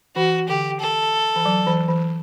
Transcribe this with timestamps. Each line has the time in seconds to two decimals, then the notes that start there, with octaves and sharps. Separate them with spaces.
0.16 E3 F#4
0.49 D3 G4
0.81 A4
1.36 E3
1.45 F#3
1.67 E3
1.88 E3